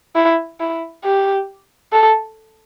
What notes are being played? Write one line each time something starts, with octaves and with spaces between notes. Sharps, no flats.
E4
E4
G4
A4